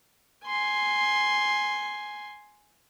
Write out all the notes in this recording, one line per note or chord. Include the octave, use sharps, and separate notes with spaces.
G#5 C6